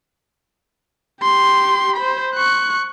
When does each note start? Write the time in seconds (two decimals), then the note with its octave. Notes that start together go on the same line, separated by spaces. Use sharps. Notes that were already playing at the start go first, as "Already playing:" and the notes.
1.23 G4 C6
1.97 C5 B5
2.35 C#6 F#6